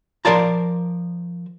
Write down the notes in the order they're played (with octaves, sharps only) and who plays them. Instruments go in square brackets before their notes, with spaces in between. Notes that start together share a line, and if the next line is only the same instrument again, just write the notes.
[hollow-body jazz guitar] F3 A#4 C5 D5 A5 A#5